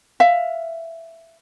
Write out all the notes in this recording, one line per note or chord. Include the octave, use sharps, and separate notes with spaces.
E5 F5